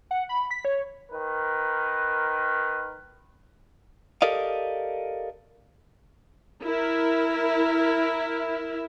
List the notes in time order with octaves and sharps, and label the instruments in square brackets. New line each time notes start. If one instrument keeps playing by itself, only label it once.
[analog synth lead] F#5
B5
B6
C#5
[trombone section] D#3 A#4 B4
[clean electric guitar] G4 A4 A#4 D5 D#5 F5
[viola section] E4 A#4